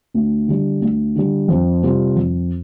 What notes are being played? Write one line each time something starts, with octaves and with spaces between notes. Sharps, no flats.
D2
D3 G3
D2
D3 G3
F2
C3 G3 C4 F4
F2